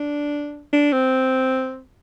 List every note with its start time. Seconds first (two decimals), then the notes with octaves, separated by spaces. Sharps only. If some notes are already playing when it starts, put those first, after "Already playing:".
Already playing: D4
0.73 D4
0.93 C4